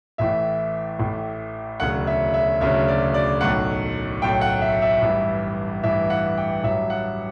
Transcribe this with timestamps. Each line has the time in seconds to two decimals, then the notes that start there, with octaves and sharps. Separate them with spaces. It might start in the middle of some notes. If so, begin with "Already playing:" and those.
0.18 A1 A2 E3 E5
0.99 A1 A2 E3
1.80 E1 D2 C#3 F#3 F#5
2.07 E5
2.34 E5
2.60 E1 D2 C#3 F#3 E5
2.88 D5
3.14 D5
3.41 B1 A2 F#3 F#5
4.22 B1 A2 F#3 G5
4.41 F#5
4.61 E5
4.82 E5
5.02 A1 G2 E3
5.83 A1 G2 E3 E5
6.10 F#5
6.37 G5
6.64 A1 G2 F#3 E5
6.90 F#5